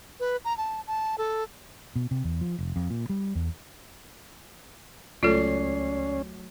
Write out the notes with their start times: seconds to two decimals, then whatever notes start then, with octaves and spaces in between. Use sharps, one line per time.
0.20 B4
0.45 A#5
0.58 A5
0.87 A5
1.18 A4
1.96 B2
2.11 C3
2.24 E2
2.41 F3
2.59 F1
2.76 F2
2.90 A#2
3.10 G3
3.35 E2
5.23 C#2 F#3 A3 C#4 F4 A4 D5 C7